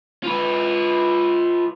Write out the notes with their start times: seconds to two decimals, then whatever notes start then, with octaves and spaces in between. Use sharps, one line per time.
0.23 F4 B4